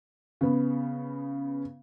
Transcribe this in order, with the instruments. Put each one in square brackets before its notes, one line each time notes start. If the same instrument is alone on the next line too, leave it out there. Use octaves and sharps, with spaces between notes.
[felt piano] C#3 B3